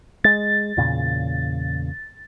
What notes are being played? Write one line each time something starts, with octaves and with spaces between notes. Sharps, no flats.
G#3 A6
E2 A#2 C#3